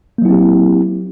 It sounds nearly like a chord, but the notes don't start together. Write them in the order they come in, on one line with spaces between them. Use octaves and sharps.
A#3 F#3 E4 C4 G4